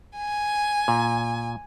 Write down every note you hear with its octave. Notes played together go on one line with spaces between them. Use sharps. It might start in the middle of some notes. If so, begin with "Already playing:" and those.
G#5
A#2